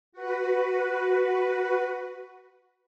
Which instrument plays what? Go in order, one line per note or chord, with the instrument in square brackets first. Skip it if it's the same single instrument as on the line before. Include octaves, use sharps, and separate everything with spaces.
[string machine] F#4 B4